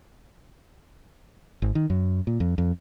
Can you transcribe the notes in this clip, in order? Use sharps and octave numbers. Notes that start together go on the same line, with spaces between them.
G#1
D#3
F#2
A#2
F2
F2